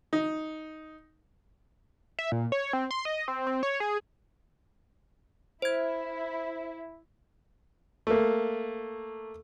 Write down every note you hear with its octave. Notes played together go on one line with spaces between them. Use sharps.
D#4
E5
A#2
C#5
C4
C6
D#5
C4
C4
C#5
G#4
E4 C5 G#6
A3 A#3